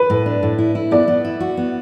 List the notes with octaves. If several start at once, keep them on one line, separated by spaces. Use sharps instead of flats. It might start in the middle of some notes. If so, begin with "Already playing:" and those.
Already playing: B4
A2
D4
A2
E4
E4
B3 D5
B3
E4
F#4
B3